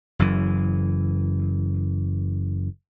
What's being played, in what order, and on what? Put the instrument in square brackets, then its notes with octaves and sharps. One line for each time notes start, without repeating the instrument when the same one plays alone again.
[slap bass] F#1 F#2 E3